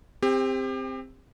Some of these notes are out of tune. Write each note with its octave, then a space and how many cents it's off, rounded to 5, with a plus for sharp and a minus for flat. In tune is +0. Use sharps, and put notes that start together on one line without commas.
C4 +0 G4 +30